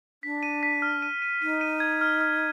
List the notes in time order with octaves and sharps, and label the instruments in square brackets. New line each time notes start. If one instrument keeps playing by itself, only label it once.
[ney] D4 [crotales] B6
[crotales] D#7
B6
F6
D#7
D#7
[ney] D#4 [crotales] D#7
[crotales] D#7
G#6
F6
F6